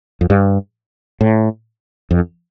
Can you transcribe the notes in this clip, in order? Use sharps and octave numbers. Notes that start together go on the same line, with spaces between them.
F2
G2
A2
F2